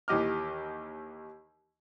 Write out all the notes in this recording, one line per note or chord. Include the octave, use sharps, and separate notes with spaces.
D#2 E3 G4 D#5 D6 F6